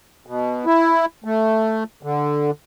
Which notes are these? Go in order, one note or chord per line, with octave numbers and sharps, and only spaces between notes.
B2
E4
A3
D3